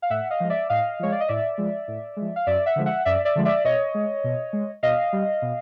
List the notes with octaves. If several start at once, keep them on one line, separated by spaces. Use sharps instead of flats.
F5
A2 E5 F#5
D#5 F5
F3 G#3
D5 E5
A2 D#5 F5
F3 G#3 C#5
D5
D#5
A2 D5 E5
F3 G#3
A2
F3 G#3
F5
F#2 D5 E5
E5 F#5
D3 F3 G#3
E5 F#5
F#2 D5 E5
D5 E5
D3 F3 G#3
D5 E5
B2 C#5 D#5
G#3
B2
G#3
B2 D#5 F5
G3
B2